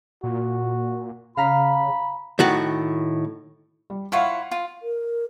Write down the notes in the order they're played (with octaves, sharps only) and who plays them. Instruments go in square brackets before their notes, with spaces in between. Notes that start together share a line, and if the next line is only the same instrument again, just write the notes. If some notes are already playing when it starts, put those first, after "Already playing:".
[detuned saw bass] A#2 [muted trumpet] F#4
[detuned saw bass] C#3 [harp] F5 A#5 B6 [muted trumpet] B5
[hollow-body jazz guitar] A2 D#3 F#4 F#5
[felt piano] G3
[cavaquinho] E4 F4 C#5 [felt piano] F5 F#5
[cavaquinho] F4
[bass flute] A#4